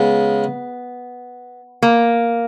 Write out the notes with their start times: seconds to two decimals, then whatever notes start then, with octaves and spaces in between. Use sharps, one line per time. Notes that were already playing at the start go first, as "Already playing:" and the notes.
Already playing: C#3 G#3 B3
1.82 A#3